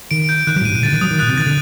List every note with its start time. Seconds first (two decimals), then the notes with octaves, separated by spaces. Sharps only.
0.11 D#3 D7
0.29 G6
0.47 D#3 F#6
0.56 F#3
0.61 A2
0.65 G2 D#7
0.74 A#2
0.83 D3 A6
0.93 D#3
1.01 F#3 D#6
1.11 D#3
1.19 A#2 F#6
1.28 C3
1.38 D#3 A6
1.47 D3